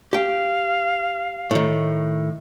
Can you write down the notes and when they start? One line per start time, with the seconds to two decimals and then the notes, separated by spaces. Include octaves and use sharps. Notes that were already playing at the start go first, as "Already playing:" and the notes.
0.13 G4 F5 G5
1.51 A2 D#3